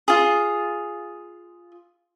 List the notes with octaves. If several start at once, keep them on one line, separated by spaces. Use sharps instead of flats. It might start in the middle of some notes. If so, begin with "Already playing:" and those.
F4 G#4